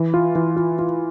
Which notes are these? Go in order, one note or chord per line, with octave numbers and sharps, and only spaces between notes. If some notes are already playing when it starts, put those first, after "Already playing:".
Already playing: E3
F4
E3
F4
F4